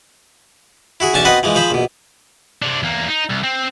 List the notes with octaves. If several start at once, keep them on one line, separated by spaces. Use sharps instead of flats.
E4 F#4 G#4
B1 E2 C#4 D4 G#5 A5
B3 C4 F#4 B4 D#5
E3 F3 G#3
F3 G#4 C5 B5
A#1 B2
C3 D4
E2 A#3
D#4
C2
C4